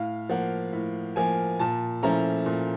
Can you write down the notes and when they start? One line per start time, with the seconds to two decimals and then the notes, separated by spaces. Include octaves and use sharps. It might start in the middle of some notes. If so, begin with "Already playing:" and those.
Already playing: A2 F5
0.29 F3 A#3 F#5
0.73 A2
1.16 F3 A#3 G#5
1.59 A#2 A5
2.03 F3 A3 C#4 E4 A#5
2.46 A#2